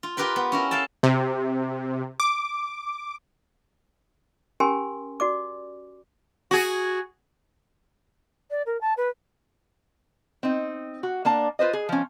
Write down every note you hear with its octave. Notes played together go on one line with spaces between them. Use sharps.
F4
F4 G4 A#4 B4 G5
B3
C#4 E4 A#4
A4 F5 G5 A5
C3
D6
C#4 G4 A#4 G#5 C6
F#4 D5 D6
F#4 G#4
D5
A#4
A5
B4
C4 D#4
F#4
A#3 D4 A5
F4 B4 C5 D#5
G#4
F3 C#4